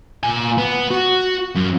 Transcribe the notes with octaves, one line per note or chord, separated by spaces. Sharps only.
A#2 G#5
B3
F#4
F#2